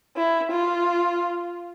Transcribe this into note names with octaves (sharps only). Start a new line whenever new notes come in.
E4
F4